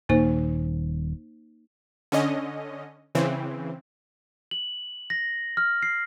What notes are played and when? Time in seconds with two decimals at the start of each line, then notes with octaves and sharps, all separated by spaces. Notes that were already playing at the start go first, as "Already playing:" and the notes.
0.09 D#1 A#3 D#4 C5
2.12 D3 C#4 D#5
3.15 C#3 E3 C4
4.51 F#7
5.10 A#6
5.57 F6
5.83 C7